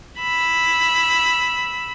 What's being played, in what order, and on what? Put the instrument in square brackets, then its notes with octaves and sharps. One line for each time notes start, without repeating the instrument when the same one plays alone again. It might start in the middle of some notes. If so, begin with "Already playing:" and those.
[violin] B5 E6